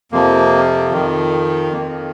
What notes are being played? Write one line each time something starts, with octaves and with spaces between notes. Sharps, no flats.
F2 C3 F3 A#3
F2 D#3
F2 D#3 A#3